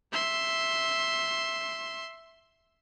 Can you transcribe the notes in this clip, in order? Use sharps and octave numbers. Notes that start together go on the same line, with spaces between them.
E5 C6